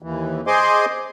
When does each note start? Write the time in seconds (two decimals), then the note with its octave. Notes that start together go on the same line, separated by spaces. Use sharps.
0.02 D#2 E3
0.47 G#4 C5 D#5 G#5 C6 D6